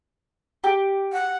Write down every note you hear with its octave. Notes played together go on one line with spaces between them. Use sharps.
G4
F#5